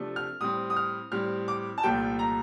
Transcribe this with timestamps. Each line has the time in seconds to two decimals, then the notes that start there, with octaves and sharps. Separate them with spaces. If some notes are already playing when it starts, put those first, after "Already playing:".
Already playing: C3 F3 A3 D4
0.16 F6
0.40 A2 G3 C4 D#6
0.70 D#6
0.76 F6
1.11 A2 G3 C4 F6
1.48 D6
1.78 A5
1.83 C2 A#2 F3 A3 G5
2.19 A#5